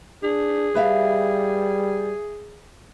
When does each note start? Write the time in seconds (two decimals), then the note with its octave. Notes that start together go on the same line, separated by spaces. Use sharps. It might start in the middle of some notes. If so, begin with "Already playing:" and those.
0.23 D4 G#4
0.75 G3 B4 E5 F5